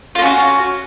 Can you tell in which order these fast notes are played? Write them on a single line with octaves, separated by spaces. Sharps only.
F4 A#3 C#4 F#4